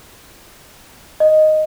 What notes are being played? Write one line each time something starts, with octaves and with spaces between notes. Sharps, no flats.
D#5